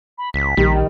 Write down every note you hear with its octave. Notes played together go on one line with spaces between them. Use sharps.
B5
C#2 B6
A#1 D#3 G3